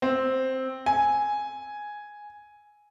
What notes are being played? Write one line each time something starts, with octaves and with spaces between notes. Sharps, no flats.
C4
G#5